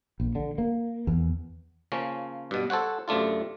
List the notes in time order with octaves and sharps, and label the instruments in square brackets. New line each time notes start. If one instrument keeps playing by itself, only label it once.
[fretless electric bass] A#1
D3
A#3
E2
[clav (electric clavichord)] C#3 F3 A#3 C#4
G2 B2
A4 C5 C#5 F#5
F#2 C3 A3 D4 F4